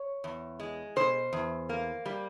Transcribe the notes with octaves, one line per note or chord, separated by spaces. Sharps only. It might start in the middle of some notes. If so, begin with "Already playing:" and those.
Already playing: C#5
E2
G#3
B2 C5
E2
A#3
G3